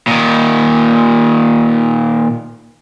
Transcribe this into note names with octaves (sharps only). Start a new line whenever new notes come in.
A#2 D#3